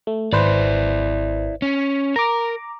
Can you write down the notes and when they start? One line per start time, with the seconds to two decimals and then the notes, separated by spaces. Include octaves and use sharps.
0.07 A3
0.33 G#1 E4 B4 C5 D5
1.62 C#4
2.16 A#4 A#5 D6